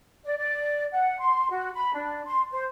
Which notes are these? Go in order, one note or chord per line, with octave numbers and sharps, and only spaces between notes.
D5
D5
F#5
C6
F#4
B5
D4
C6
C5